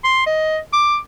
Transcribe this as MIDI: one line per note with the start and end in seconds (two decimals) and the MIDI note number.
0.04 0.23 84
0.26 0.58 75
0.73 0.98 86